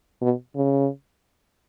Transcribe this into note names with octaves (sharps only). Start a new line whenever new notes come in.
B2
C#3